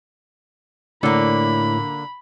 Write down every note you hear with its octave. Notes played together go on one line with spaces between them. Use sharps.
A2 D3 A#3 B5